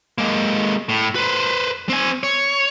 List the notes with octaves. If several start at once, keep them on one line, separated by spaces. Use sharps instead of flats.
G#3 A#3
A2
B4 C5
C4 G#5
C#5